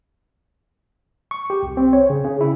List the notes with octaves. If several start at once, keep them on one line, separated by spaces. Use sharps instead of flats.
C#6
G4
C2
C4
C#5
C#3
C#3
E4